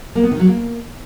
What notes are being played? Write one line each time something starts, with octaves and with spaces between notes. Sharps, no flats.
A#3
B3
D#3
F#3
A#3